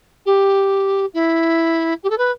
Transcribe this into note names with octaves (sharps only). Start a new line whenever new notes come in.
G4
E4
G4
A4
B4